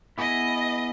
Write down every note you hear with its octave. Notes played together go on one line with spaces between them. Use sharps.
B3 E4 G#4 D#5